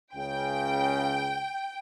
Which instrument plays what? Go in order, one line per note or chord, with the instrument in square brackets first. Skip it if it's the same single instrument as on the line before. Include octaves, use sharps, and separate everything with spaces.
[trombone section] C#2 C#3 [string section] G5